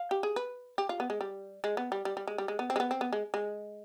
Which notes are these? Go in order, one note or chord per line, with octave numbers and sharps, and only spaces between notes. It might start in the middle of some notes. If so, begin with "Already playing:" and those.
Already playing: F5
G4
G#4
B4
G4
F4
B3
G#3
G3
G#3
B3
G3
G3
G3
G#3
G3
G#3
B3
C4
G#3
B3
C4
B3
G#3
G#3